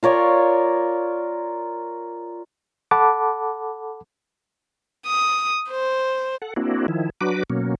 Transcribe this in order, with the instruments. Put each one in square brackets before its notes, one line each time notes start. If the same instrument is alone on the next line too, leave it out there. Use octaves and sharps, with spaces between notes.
[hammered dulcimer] F4 A#4 C#5 D5
[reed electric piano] A4 F#5 A5 B5 D6
[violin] D#6
C5
[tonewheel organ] A4 F#5
A#3 C4 D4 E4 F#4
D#3 F3 E4
F#3 D4 F#4 B4 D6
B2 F#3 A#3 C#4